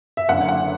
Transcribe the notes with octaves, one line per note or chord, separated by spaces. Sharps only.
E5
F#1 F#2 D3 F#5
F#5